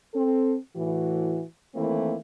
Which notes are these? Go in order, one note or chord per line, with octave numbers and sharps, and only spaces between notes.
C4 A4
A2 E3 F#4
D#3 E3 A3 A#3 C4 E4